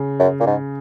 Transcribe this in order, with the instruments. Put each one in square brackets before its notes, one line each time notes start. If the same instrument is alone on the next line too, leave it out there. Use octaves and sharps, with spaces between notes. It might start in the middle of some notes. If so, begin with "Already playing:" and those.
Already playing: [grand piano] C#3
[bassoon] F#2
A#2
G#2